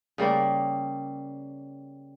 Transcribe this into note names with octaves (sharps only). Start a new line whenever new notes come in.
C#3 G3 A#3 D5